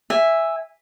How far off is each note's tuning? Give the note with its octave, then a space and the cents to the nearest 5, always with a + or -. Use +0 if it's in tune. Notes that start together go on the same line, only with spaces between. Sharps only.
E5 +0 G#5 -15